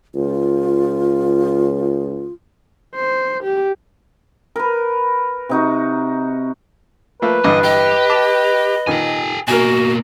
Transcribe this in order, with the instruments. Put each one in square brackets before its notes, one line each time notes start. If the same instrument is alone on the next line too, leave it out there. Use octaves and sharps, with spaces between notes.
[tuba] C#2 [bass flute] F4
[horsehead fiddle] C5
G4
[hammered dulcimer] A#4 B4
C3 D#4 F#4
[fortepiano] F3 A3 A#3 [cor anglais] B4
[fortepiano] A1 G2 D3 [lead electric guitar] D#5
[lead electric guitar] G4 [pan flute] D#5
[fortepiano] A5 D6
[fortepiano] A#2 D#3 [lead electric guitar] G4 G#5
[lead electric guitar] B2 A#3 [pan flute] F#4 [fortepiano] A#4 G#5